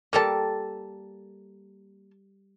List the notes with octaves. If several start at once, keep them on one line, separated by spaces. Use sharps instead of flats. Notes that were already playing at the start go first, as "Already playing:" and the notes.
G3 A#3 A4 A5 A#5